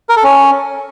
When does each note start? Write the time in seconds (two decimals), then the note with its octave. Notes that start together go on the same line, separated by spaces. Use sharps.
0.09 A#4
0.16 A4
0.24 C#4